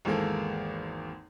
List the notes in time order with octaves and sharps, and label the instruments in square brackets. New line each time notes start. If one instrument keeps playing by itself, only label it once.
[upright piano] G#1 E2 G#3 A#3 A4